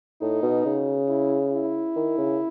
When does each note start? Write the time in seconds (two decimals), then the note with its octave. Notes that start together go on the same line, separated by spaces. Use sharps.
0.21 A2 D#4
0.43 B2
0.66 C#3
1.08 E4
1.52 E4
1.96 D#3
2.18 C#3